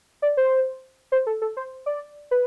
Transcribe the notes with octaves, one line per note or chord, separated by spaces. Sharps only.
D5
C5
C5
A4
A4
C5
D5
B4